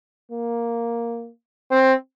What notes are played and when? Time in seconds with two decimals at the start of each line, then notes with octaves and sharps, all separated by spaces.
0.32 A#3
1.71 C4